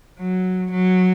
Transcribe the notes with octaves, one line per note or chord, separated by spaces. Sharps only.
F#3
F#3